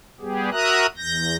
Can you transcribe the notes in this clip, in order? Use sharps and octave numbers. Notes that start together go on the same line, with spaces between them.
G3 B3 G4 G#4
F#4 A#4 E5 A#5 D#6 F#6
E2 G6 A#6